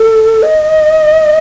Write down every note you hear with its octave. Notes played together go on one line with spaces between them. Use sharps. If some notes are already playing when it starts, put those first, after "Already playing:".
Already playing: A4
D#5